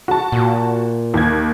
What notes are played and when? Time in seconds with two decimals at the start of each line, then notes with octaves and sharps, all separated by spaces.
0.08 F#4 A5
0.32 A#2
1.14 D#2 G#6